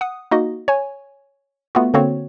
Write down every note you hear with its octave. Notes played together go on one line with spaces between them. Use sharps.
F#5 D#6
A#3 D#4 F#4 D#5
C#5 G#5
A3 B3 F4 F#4
D3 A#3 C4 F#4 C#5